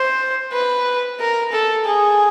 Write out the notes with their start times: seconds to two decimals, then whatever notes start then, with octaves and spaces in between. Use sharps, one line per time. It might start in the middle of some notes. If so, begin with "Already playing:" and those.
Already playing: C5
0.53 B4
1.20 A#4
1.52 A4
1.86 G#4